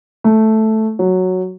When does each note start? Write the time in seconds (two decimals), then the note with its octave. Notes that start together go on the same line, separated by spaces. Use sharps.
0.24 A3
0.99 F#3